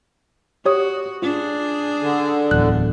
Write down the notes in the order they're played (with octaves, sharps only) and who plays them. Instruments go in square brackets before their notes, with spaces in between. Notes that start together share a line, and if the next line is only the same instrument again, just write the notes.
[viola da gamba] F#4 [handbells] G4 C#5 D#6
[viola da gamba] D4 G#4 [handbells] F4
[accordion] D3
[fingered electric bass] D1 E2 [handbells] F#6